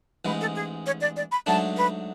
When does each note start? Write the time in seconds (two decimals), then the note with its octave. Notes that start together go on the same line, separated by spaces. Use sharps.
0.25 A1 G#2 G#3 B4
0.41 A4
0.55 G#4
0.86 C#5
1.01 D5
1.16 D5
1.32 B5
1.46 G#2 F#3 A3 D4 A5
1.77 B4